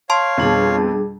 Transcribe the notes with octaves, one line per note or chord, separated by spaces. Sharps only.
C#5 F5 A5 C6
F2 B2 G3 D4 G#4